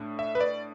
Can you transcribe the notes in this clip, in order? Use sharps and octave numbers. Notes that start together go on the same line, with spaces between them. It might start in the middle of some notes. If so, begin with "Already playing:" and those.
Already playing: A2 A3 D4
E5
B4
D5